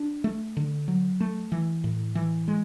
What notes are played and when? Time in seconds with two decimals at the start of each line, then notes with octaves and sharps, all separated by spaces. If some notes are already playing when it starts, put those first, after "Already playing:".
Already playing: D4
0.24 A3
0.57 D3
0.88 F#3
1.20 A3
1.52 E3
1.84 A2
2.15 E3
2.48 G#3